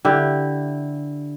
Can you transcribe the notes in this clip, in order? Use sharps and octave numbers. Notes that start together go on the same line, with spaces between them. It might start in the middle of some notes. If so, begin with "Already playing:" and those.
D3 E4 G4